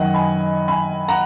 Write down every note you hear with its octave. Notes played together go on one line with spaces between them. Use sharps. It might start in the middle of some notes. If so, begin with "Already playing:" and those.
Already playing: F#2 D#3 D#5 F#5
G#5 B5
G#5 B5
F#5 A#5